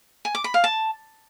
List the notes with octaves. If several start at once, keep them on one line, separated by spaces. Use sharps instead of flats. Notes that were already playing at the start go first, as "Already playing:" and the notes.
G#5
D6
B5
F5
A5